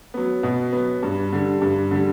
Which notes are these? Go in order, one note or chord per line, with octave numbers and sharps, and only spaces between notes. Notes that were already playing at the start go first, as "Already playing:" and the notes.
F#3 B3
B2
F#3 B3
G2
D3 G3
G2
D3 G3